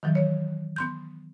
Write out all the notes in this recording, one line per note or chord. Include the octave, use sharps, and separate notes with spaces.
D#3 E3 F#3
C#5
B3 C6 G6